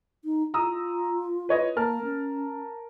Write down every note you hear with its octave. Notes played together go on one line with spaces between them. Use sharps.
D#4
F4 A#5 D#6 E6
B4 C#5 D#5
A#3 A#4 A5 F6
C#4